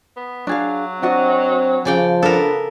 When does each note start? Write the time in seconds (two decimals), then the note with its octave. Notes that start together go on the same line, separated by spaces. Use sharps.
0.17 B3
0.47 F#3 D4 G#4 F5
1.02 C4 D4 F#4 D#5
1.85 C#3 F3 D5 G5
2.23 B3 D4 A4 A#4